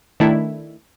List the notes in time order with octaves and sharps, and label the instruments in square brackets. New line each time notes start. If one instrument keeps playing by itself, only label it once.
[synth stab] D#3 A3 D4 E4